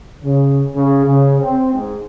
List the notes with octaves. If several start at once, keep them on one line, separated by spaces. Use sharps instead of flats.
C#3
C#3
C#3
C4
G#2